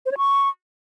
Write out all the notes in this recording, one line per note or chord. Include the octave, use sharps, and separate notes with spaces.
C5
C#5
C#6